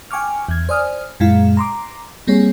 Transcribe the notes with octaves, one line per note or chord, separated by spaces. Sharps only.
G5 G#5 C#6 D6 F6
E2 G#6
C5 D5 G#5 D#6 F6
F#2 A#2 G#3 E4 F5
A#5 C6 D6
G3 A#3 C4 G#4 C#5